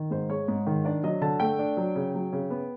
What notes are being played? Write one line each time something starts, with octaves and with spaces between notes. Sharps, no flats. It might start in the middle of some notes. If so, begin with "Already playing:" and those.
Already playing: D#3
G#2 C5
G#3 C#5
G#2
D#3
D4 D5
F#3 D#5
D3 A5
A3 G5
D4
F#3
C#3
F#3
C#3
B3